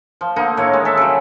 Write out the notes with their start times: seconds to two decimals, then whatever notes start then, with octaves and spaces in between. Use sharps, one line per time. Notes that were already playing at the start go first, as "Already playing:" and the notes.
0.21 F3
0.36 D3 A#3 D#4
0.57 A2 D#3 A3 C#5
0.73 G#3
0.85 A4 E5
0.97 C#3 F#3 G3